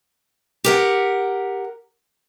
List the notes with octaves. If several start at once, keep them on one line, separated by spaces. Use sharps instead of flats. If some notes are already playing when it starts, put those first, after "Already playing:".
G4 A#4 F#5